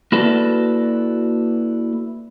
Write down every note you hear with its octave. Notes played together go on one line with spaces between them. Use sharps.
A#3 E4 F#4 A4 B4 D5